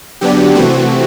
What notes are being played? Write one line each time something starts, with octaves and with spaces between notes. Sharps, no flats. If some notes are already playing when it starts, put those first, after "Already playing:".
D3 F#3 B3 D4 G4
C3 E3 A3 C4 F#4